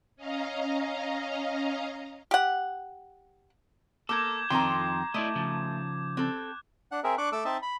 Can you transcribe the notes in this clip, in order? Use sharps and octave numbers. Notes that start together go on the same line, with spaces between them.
C#4 D#5 F5 A#5
G4 F#5
A#3 A4 A#4 D6 G6 G#6
F2 D#3 C4 F4 A4 G5 A#5 C6
A3 E4 D5 D#5
C#3 F3
C4 A4 F#6
D4 F#5
C4 G#4 A#4 E5
D4 C#6 D6 F#6
A3 A4 D6 E6
C4 D#4 D#5 E5 A5
B5